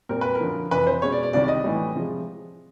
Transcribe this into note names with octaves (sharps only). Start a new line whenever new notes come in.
A#2 G3 C4 A#4
B4
A#4
F#2 D3 F3
F2 C3 E3 B4
C5
B2 G#3 C#4 C#5
D5
D5
C2 C3 D#3 G3 D5
D5
D#5
A2 E3 G3
C3 F3 G#3